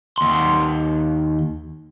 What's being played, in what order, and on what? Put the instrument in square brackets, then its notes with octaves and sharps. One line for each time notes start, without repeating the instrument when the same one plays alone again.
[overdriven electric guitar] D#2 C6